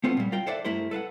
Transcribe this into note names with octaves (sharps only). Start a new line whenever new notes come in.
A3 B3 C4 F4 A4
A#2 G3
F4 A#4 G5
A4 C5 D5 E5 F#5
G2 A3 E4 A#4 C5
A4 B4 F5 F#5